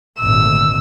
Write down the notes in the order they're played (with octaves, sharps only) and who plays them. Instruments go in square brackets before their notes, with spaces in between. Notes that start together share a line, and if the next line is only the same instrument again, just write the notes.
[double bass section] G#1 D2 A#2 [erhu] E6